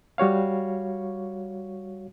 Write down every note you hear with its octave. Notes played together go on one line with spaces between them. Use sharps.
G3 F#4 C#5 F5